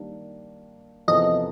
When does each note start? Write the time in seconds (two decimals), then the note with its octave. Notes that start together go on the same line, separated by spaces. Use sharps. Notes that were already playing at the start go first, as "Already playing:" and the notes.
Already playing: D#3 G3 A#3 D4
1.08 E2 C3 F3 A3 D#5